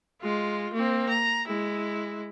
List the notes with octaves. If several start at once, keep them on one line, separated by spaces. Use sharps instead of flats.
G#3 F4
A#3 C4
A#5
G#3 E4